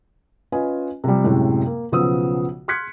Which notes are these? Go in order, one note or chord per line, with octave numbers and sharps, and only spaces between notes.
C#4 F4 B4 D#5 G#5
C3 F3 G3
F#2 A2 C3 G#3
A#3
B1 C#3 F3 B3 D#6 E6
C6 F6 F#6 G#6 B6 C#7